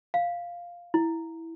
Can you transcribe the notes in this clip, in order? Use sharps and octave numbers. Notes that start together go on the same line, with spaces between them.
F5
E4